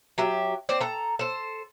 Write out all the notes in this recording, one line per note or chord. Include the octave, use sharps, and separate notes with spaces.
F#3 G4 E5
C4 C5 D5
A4 A#5
A4 C5